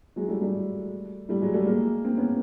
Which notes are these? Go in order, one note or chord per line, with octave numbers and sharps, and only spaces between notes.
F#3 G#3
G3 A3
G3 A3
G3 A3
F#3 G#3
G3 A3
G#3 A#3
A#3 C4
B3 C#4